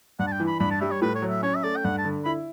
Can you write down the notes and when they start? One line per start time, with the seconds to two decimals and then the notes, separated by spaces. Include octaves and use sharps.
0.19 G2 F#5
0.27 A5
0.32 G5
0.40 E3
0.47 B5
0.60 G2 B5
0.71 A5
0.81 G3 E5
0.91 C#5
1.02 A2 B4
1.15 C#5
1.22 F#3
1.30 E5
1.43 C#4 C#5
1.56 E5
1.63 A3 D5
1.77 G5
1.84 G2 F#5
1.98 A5
2.05 D3
2.25 E4 B5